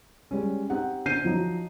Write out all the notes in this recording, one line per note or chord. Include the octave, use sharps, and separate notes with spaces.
G3 G#3 C#4
C4 D#4 G4 F#5
D3 C5 G6 C7 D#7
F3 F#3 D#4